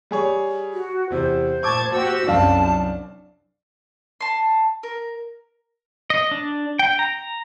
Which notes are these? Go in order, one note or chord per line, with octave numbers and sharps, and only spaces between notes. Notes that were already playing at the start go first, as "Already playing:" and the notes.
G3 G#4 C#5
F#4
E2 C3 C5
A#2 A5 C#6 D6 G#6
F#4 G4 E6
C2 F#2 D4 F5 A5
A5 C6
A#4
D#5
D4
G5
A#5